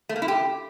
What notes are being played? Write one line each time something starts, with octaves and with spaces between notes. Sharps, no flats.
A3
A#3
E4
G4